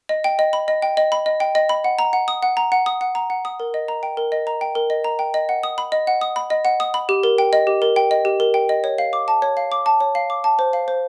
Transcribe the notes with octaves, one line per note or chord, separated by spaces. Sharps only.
D#5
G5
D#5
B5
D#5
G5
D#5
B5
D#5
G5
D#5
B5
F#5
A#5
F#5
D#6
F#5
A#5
F#5
D#6
F#5
A#5
F#5
D#6
A#4
D#5
A#5
G5
A#4
D#5
A#5
G5
A#4
D#5
A#5
G5
D#5
F#5
D#6
B5
D#5
F#5
D#6
B5
D#5
F#5
D#6
B5
G4
A#4
G5
D#5
G4
A#4
G5
D#5
G4
A#4
G5
D#5
C#5
F5
D6
A5
C#5
F5
D6
A5
C#5
F5
D6
A5
C5
F5
C5